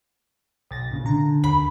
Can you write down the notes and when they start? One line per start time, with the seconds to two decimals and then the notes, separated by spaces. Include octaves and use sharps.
0.71 B1 A6 A#6
0.91 A#2 C#3
1.06 D3 A#5
1.44 D#2 B5